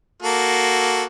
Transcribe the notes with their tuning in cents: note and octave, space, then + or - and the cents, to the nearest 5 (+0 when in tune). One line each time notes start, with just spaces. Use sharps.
A#3 +0 F#4 +0 A4 +0